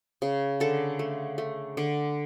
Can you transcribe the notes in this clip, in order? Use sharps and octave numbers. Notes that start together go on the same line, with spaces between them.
C#3
D3 A4
A3
A3
D3